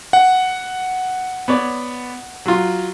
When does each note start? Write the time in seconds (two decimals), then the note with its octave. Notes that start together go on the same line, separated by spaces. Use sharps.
0.13 F#5
1.48 B3 C#5 D5
2.46 F#3 F4